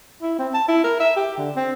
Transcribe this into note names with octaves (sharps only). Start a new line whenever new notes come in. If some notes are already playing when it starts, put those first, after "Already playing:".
E4
C4
A5
E4
A#4
E5
G4
D3
C4